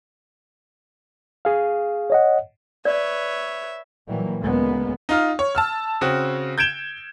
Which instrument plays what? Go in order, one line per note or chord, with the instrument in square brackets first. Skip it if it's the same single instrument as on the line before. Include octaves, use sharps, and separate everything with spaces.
[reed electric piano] G#4 F5
[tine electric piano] C#5 D#5 F#5
[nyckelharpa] B4 C#5 [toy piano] D5 [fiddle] E5
[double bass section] A#2 E3 F#3 G3 A#3
D2 A#2 C#3 G#3 A#3 B3
[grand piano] D#4 F4 F6
C#5
A5 E6 F6
C#3 C4 F#4
G6 G#6 D7 E7 G7